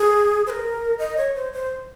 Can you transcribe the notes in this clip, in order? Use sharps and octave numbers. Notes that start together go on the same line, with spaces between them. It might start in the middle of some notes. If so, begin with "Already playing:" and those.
Already playing: G#4
C5
A#4
D#5
C#5
C5
C5